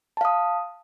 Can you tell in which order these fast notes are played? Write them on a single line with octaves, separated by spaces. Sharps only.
A5 F5 D#6